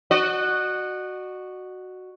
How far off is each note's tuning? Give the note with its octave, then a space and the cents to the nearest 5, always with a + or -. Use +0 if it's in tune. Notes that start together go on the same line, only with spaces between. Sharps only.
F#4 +0 D#5 -45